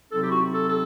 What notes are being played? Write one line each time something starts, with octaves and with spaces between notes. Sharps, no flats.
C3 F#3 C4 D#4 A4
G4
E4
F#4
A4
A4